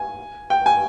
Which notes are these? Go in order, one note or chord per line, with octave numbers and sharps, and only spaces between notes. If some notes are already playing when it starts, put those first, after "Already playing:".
Already playing: G#5
G5
G#5